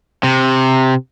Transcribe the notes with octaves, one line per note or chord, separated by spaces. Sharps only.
C3